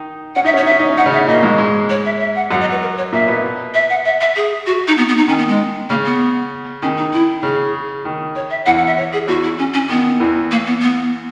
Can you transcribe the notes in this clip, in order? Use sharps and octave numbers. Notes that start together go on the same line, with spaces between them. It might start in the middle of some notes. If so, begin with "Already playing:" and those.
Already playing: D#3 D#4
C#4 F#5
D#4 E5
C#4 C#5
D#4 E5
C#4
D#4
C#4
D#4 F#5
C#3 C#4
E5
A#2 A#3 D#5
G#2 G#3
G#2 G#3
C#5
E5
E5
F#5
F#2 F#3 F#5
D#5
B4
A#4
C#5
A#2 A#3 E5
B2 B3
E5
F#5
E5
E5
G#4
F#4
D#4
B3
B3
D#4
D#3 C#4
B3
G#3
C#3 A#3
B3
D#3 C#4
D#4
E4
C#3 G#4
D#3
C#5
E5
E2 E3 F#5
F#5
E5
C#5
G#4
E2 E3 F#4
E4
C#4
C#4
D#3 B3
E2 E3
A#3
B3
B3